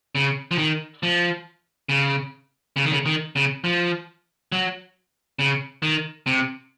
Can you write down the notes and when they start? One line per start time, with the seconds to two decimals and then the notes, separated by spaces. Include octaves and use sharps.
0.15 C#3
0.51 F3
0.58 D#3
1.03 F3
1.89 C#3
2.76 C#3
2.85 D#3
2.92 C#3
3.06 D#3
3.36 C#3
3.64 F3
4.52 F#3
5.39 C#3
5.82 D#3
6.26 C3